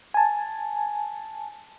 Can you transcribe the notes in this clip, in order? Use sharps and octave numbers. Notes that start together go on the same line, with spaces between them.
G#5 A5